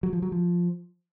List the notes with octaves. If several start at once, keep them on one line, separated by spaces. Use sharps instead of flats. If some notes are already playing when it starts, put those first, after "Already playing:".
F#3
F3
F#3
F3